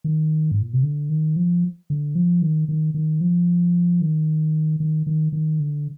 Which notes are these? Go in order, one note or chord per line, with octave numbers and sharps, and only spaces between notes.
D#3
G#2
A#2
C3
D3
D#3
F3
D3
F3
D#3
D#3
D#3
F3
D#3
D#3
D#3
D#3
D3